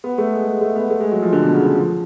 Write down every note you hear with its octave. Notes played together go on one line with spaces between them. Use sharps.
B3
A3
G#3
G#3
A3
B3
A3
G#3
F#3
F3
D3
B2
C#3
D3
F3